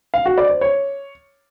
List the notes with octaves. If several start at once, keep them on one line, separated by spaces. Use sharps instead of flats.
F5
F#4
D5
C5
C#5